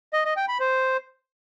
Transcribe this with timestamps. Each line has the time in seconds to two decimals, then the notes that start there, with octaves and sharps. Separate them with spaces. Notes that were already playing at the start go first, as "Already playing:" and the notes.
0.13 D#5
0.25 D#5
0.37 G5
0.48 B5
0.60 C5